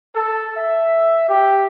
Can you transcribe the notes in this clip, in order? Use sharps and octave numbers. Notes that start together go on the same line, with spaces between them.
A4
E5
G4